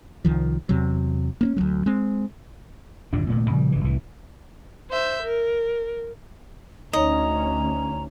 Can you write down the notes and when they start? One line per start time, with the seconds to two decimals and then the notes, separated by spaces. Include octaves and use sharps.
0.25 C2 D#3 F3
0.69 E2 C3 F#3
1.41 A#3 C4 C#4
1.56 D2 F#3 G#3
1.86 G#3 C4
3.13 G1 D#2 A#2 D4
3.29 D#1 A#2 A3 B3
3.50 A#2 C#3 F3 G3
3.72 G1 C#3 E3
3.84 C2 A2 E3
4.90 C5 E5 G6
5.23 A#4
6.93 D2 C#4 D#4 C#5 D#5 A#5